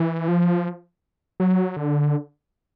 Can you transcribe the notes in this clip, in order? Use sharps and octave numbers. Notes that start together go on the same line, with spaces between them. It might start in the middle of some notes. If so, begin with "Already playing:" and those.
Already playing: E3
F3
F#3
D3